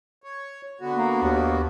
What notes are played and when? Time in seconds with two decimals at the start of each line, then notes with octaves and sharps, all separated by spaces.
0.24 C#5
0.81 D3 B3 F#4
0.97 A#3
1.23 D#2